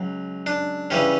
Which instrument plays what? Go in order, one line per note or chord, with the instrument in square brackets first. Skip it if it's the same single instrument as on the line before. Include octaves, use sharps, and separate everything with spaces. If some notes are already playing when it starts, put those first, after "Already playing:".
Already playing: [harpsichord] C#2 F#3
D4
C#3 E3 G3 C#4